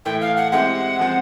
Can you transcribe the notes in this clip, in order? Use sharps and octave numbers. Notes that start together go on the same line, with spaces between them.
A2 E3 A3 G5
F5
F#5
G#3 C4 E4 G4 F#5
F3 G#3 C4